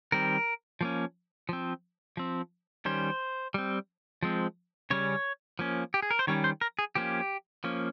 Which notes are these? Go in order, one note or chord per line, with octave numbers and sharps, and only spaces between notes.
D#3 G3 C4 A#4
F3 A#3 C#4
F3 C4
F3 C4
D#3 G3 C#4 C5
G3 C4
F3 G#3 C4
C#3 G3 C#4 C#5
F3 A#3 C#4
G4
G#4
A#4
C5
D#3 G3 C#4 C#5
C5
A#4
G#4
F3 A#3 C#4 G4
F3 A#3 C#4